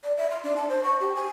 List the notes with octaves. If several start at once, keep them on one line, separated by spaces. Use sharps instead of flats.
D5
E5
C6
D4
A5
C5
C#6
G4
G#5